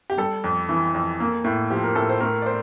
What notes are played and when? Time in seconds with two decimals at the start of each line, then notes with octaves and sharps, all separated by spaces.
0.10 G4
0.18 G3 A4
0.44 F2
0.69 E3
0.95 F2
1.20 A#3
1.44 A2
1.70 F3 G4
1.83 A#4
1.95 A2 A4
2.09 C5
2.20 A3 A#4
2.42 D5
2.46 C4 C5